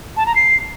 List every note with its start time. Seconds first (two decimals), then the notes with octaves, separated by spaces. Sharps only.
0.17 A5
0.26 A#5
0.36 C7